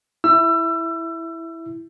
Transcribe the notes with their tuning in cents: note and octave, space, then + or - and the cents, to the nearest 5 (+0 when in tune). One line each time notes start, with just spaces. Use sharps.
E4 +0 E6 +30